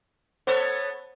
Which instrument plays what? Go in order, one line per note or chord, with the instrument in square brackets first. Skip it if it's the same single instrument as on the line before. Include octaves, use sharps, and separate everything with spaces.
[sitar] B3 A4 C#5 [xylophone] C5